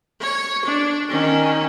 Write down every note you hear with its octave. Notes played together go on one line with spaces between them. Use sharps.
C#5
D4
D#3 C#4